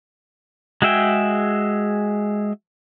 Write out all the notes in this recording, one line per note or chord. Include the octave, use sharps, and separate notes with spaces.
G#3 F#4 G#4 E5 G5